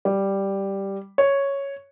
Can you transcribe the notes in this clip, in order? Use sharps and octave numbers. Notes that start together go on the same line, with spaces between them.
G3
C#5